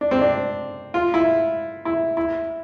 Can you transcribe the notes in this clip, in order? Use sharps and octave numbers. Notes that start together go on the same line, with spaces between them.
D4
C4
D4
F4
E4
E4
E4